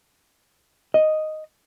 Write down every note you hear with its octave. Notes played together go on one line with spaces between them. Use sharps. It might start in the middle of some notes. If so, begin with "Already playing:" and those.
D#5